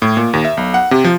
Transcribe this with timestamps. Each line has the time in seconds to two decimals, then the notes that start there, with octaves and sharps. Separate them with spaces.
0.02 A2
0.17 A#2
0.33 D#2
0.45 E5
0.57 B1
0.74 F#5
0.91 C3
1.04 F3